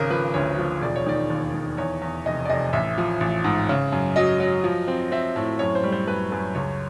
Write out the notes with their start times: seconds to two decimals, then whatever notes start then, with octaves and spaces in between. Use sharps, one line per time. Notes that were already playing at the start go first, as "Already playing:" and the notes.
Already playing: G#1 C#3 A#4
0.10 F3 B4
0.34 D2 C#5
0.58 F3
0.81 E1 D5
0.96 C#5
1.07 D#3 D5
1.30 D#2
1.54 D#3
1.77 E2 C#5
2.02 E2
2.25 F1 D#5
2.45 D5
2.50 F1 D#5
2.73 A1 E5
2.98 F3
3.20 A1
3.44 G#2
3.69 C#3
3.92 F#2
4.16 F#3 D#5
4.40 F#3
4.64 F3
4.88 C4
5.12 C4 E5
5.36 A2
5.59 F#2 C#5
5.75 C5
5.84 G3
5.92 C5
6.07 F#2 B4
6.31 F#2 B4
6.55 C#2 C#5